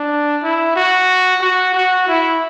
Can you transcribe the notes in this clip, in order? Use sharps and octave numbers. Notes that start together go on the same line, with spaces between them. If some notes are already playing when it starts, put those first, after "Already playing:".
Already playing: D4
E4
F#4
F#4
F#4
E4